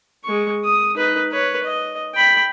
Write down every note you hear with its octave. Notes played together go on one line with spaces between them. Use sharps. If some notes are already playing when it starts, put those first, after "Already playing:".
G#3 C#6
D#6
D#4 B4
B4 C#5
D#5
G5 B5